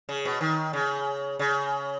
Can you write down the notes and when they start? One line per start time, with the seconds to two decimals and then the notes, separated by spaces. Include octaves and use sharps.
0.09 C#3
0.25 B2
0.41 D#3
0.73 C#3
1.39 C#3